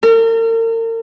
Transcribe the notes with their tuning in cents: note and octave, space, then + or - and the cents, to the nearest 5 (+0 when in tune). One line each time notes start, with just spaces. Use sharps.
A#4 -40